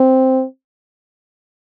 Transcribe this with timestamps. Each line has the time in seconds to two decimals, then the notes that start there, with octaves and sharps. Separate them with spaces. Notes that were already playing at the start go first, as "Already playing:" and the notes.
Already playing: C4